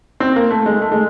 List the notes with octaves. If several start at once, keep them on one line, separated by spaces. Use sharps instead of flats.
C4
A#3
A3
G#3
A3
G#3